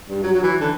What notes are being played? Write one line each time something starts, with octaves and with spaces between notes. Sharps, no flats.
G2
F#3
F#3
E3
D3